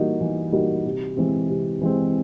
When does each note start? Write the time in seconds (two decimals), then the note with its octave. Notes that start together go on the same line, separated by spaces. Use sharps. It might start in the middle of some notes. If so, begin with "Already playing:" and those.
Already playing: E3 G3 A#3 D#4 F#4
0.21 E3
0.52 G3 A#3 D#4 F#4
0.85 C3
1.17 E3 G#3 C4
1.49 C3
1.81 E3 G#3 C4